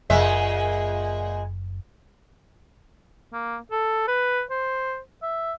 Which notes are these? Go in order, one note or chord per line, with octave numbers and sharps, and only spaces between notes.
F#1 A#2 G#3 E5
A#3
A4
B4
C5
E5